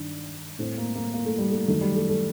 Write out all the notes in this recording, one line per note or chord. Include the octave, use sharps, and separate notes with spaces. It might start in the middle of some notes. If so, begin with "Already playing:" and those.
Already playing: G2 D#3 D4
A2 C4
A#3
A#3
A#3
A3
G3
A3
F#2 D#3 A3
G3
A3
A3